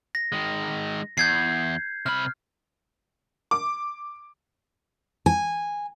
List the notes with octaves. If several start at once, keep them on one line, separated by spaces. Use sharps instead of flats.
A#6
D#3 G#3
E2 G6 G#6 C7
C3 B5 F6
D6
G#5